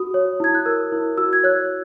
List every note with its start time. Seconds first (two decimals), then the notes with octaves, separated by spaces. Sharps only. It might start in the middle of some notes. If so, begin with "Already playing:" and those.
Already playing: F#4 D#6
0.14 C#5
0.40 E4 G#6
0.55 F#6
0.66 A#4 E6
0.92 E4
1.18 F#4 E6
1.33 G#6
1.44 C#5 F#6